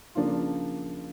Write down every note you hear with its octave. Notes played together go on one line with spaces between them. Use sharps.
C#3 F3 A#3 D4 F4